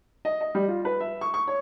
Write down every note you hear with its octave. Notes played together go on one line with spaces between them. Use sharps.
D#5
D#5
G3
F4
B4
E5
C#6
C#6
C#5